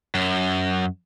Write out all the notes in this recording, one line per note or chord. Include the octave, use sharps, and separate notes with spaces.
F#2